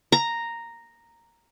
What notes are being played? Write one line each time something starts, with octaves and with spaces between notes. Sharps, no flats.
A#5